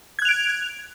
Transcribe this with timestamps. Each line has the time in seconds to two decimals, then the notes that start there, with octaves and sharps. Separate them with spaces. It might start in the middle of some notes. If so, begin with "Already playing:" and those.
0.19 G#6
0.22 F#6
0.25 F7
0.29 D7